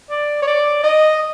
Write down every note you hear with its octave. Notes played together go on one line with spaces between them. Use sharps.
D5
C#5
D5
D#5